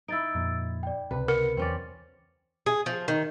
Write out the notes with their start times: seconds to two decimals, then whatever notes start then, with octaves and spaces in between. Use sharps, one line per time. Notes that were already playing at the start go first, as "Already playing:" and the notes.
0.08 D#4 E4 E6 A6 D7
0.35 F2 A#2
0.83 D5 G5
1.11 C#2 C3 B4
1.28 A#4 C#7
1.57 E2 C4 C#4 D5
2.66 G#4
2.86 F3
3.08 D#3